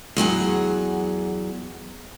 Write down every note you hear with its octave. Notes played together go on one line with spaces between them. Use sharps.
E2 F#3 G#4 F#5